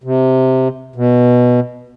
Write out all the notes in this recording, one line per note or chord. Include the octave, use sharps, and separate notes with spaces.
C3
B2